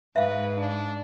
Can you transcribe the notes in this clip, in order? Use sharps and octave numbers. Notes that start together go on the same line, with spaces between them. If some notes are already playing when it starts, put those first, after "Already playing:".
G#2 B4 E5 F5
D4